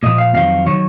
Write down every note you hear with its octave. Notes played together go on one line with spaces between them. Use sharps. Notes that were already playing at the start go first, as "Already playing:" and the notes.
A#2 F3 D#5
F5
F2 D#3 F#3 F5
D#3 F#3 C#5